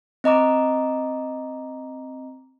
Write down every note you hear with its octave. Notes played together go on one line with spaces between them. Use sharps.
C4 D#5 A#5 D6